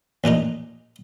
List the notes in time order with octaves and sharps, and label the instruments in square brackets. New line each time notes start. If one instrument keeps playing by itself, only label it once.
[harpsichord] A1 A#2 D4 D#4